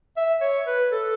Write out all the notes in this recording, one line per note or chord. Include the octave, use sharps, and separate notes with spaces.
E5
C#5
B4
A4